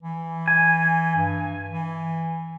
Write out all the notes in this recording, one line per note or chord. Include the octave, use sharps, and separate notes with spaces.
E3
G#5
G2
E3